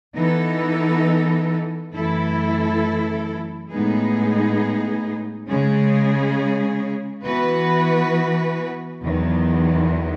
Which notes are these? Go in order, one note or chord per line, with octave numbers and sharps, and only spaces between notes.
E3 B3 D#4 A4
F#2 E3 A3 E4 A4
A2 G#3 B3 D#4 G#4
C#3 G#3 C#4 G#4
E3 B3 F#4 B4
E2 D#3 F#3